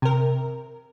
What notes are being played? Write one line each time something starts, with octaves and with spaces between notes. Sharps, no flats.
C3 A#4